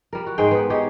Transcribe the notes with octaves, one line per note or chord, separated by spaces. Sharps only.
G3 A#4
F#4
G#2 G#3 C5 G5
B3 D#4
G#3 D#4 G4 C#5